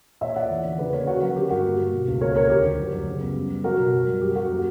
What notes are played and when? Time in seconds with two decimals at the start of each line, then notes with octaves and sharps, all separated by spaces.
0.21 A#2 C#5 E5
0.36 A#2 D5 F#5
0.50 E2
0.64 D3
0.78 C#3 B4 D5
0.93 A#3 A#4 C#5
1.07 C#3 F#4 A#4
1.21 F#3 F#4
1.36 D3 G4
1.50 G2 F#4 A#4
1.65 A#3
1.79 A#3
1.93 B2
2.07 C#2
2.21 A#3 A#4 C#5
2.36 A#2 A#4 C#5
2.49 D2 G4
2.64 D2
2.78 F#2
2.92 F#2
3.07 C#3
3.21 B3
3.35 G3
3.50 G3
3.64 F#3 F#4 A#4
3.78 B2
3.93 F#2
4.07 G3
4.21 F#2 G4
4.35 F#2 F#4 A#4
4.50 A#3